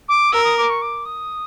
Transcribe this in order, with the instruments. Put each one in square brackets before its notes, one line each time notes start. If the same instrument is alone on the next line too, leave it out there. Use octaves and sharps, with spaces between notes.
[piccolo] D6
[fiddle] A#4 [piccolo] E6
[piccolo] D#6
D6
C#6
D6
D#6